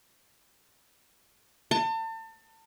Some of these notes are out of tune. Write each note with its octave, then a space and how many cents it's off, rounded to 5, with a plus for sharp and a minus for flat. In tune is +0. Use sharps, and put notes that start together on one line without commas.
A5 +35